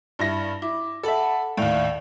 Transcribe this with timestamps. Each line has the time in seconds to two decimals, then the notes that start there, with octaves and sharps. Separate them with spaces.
0.19 G2 E4 A#6
0.62 E4 D6
1.03 A4 E5 F#5 A5 B5
1.57 D#2 A2 D5 F5